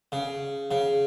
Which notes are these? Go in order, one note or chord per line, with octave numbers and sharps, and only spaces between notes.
C#3
C#3